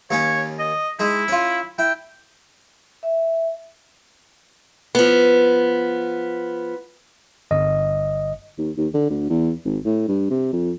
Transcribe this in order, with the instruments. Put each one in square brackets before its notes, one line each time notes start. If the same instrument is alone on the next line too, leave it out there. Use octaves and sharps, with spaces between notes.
[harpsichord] D#2 A#3 C#4 [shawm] C#5
[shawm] D#5
[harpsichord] G#3 D#4 [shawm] E4
[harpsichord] C#4 F4
[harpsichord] E4 [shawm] G5
[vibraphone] E5
[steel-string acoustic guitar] F3 B3
[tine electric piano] G1 D#5
[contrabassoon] D#2
D#2
D3
D2
E2
G#1
A2
G2
C3
F2